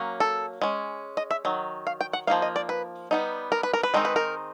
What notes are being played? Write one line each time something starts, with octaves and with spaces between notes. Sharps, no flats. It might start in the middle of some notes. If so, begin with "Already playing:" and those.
Already playing: F#3 A#3 C#4
A4
G#3 C#4
D#5
E5
D#3 F#3
F5
G5
F#5
F3 A#3 D#4 F5
D#5
D5
B4
G3 B3 D#4
A#4
B4
A#4
B4
D#3 G#3 C4 D#4 A#4
B4
A#4